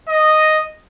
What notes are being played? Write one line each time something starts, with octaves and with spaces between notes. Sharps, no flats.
D#5